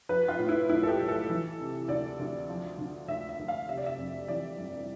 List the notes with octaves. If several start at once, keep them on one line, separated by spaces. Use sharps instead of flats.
F3 B4
F4
A2
E4
B1 E4
A4
G4
B1
A4
E3
C3
D2 D5
D2
F3
D3
D2 E5
E5
D2
F5
C3 E5
D5
E5
F2
E3 D5
G1